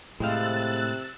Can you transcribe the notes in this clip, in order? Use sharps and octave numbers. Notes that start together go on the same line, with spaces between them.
A2 C3 G#3 C4 F5 E6 F#6 A6